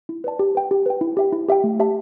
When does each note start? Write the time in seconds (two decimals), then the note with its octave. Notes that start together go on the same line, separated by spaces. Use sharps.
0.09 E4
0.24 B4 D5 A5
0.39 G4
0.55 B4 G5
0.71 G4
0.86 B4 G5
1.01 E4
1.17 G4 E5 G5
1.32 E4
1.49 G4 E5 G5
1.64 A3
1.80 G4 E5 A5